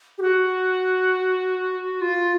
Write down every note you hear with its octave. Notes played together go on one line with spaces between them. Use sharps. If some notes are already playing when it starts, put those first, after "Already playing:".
G4
F#4
F4